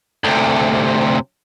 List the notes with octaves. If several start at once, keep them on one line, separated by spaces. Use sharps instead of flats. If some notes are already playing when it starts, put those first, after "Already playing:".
D2 C3